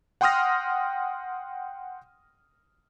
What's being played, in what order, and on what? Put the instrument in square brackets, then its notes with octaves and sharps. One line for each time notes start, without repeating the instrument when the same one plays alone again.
[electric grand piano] F#5 G5 C6 D#6 F6 A#6